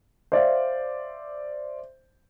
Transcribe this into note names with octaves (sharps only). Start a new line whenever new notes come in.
C5 D5 E5 F5